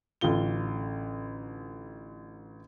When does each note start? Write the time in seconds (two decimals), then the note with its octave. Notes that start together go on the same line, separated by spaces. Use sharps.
0.21 A1 D3 F4 G7